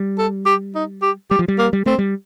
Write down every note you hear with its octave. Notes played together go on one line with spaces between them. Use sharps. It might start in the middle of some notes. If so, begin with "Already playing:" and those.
Already playing: G3
A4
G4
D#4
G4
G3 G4
F3
G3
A#3
G3
A3 C4
G3